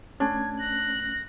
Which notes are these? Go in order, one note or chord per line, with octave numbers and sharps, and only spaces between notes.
A3 C#4 D4 G#6
F#6 A#6